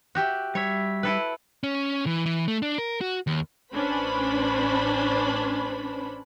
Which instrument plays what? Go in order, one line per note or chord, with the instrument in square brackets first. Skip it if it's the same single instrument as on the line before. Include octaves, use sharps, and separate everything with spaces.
[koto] F#4 G4 E5
[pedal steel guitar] G3 E5 [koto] C#5
[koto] E4 A4 B4
[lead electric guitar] C#4
E3
E3
A3
D4
A#4
F#4
D#2
[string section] A1 C#4 D4 B4 C5 B5